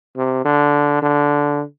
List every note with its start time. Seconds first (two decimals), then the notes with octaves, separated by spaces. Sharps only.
0.16 C3
0.45 D3
1.02 D3